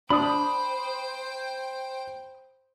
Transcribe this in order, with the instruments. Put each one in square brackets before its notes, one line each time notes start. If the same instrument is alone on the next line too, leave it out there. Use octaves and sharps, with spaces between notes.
[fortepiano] D4 [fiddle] C5 G5 [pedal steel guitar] B5 D#6